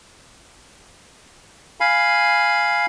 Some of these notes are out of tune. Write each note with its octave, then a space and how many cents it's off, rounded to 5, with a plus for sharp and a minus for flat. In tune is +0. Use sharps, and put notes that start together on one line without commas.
F5 +0 G#5 +0 B5 +0